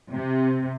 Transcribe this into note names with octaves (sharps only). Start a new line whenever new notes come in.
C3